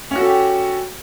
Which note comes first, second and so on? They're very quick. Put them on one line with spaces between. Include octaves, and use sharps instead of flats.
C#4 F#4 A4 G4